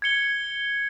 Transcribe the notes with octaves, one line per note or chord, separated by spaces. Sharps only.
G#6 C#7 G7